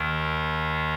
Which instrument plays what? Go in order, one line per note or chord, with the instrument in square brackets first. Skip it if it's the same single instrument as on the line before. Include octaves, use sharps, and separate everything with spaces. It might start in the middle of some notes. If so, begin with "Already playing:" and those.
Already playing: [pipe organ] D#2 D#3